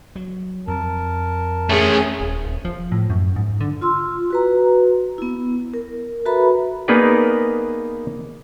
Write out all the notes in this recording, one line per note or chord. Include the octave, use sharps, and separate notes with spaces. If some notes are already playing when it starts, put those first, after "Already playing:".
F#3
F2 A#4 A5
A3 C#4 G#4
D#1
D#1
F3
A2
F#2
G#2
D3
F4 C6 E6
F#4 B4 A#5
B3 E4
A#4
F#4 A4 B4 E5 A#5 B5
A#3 B3 D#4 G#4 B4 D5